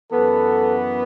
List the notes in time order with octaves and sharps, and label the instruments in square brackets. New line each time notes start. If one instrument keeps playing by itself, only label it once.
[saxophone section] F#2 E3 B3 [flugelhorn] A4